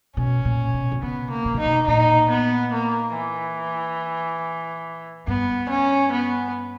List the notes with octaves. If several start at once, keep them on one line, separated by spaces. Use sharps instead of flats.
B2 C#4
A#2
B2
B2
C#3 B3
A#3
B2
C#3
D#4
B2
A#2 D#4
B3
A#3
E3
G2 B3
C#4
B3